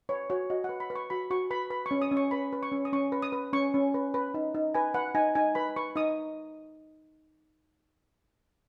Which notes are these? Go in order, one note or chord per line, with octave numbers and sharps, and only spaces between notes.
B4 C#5
F#4 C#5
F#4 D#5
F#5
B4
B5
B4
C#6
F#4 B5
F#4 C#6
B4 B5
B4 B5
C#6
C#4
D#6
C#4
C#6
B4 B5
B4
C#6
C#4
D#6
C#4 C#6
B4
D#6
B4
C#4 C#6
C#4
B4
B4
D#4
D#4
B4 G#5
B4 F#5
D#4 G#5
D#4 G#5
B4 B5
B4 C#6
D#4 D#6